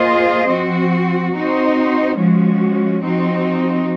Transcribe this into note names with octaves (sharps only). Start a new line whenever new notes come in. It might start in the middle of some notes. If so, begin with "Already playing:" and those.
Already playing: A#3 F4 G#4 C5 D#5
F3 C4 F#4
C4 D#4 F#4 C5
F3 G#3 C#4 F#4
F3 C4 D#4 F#4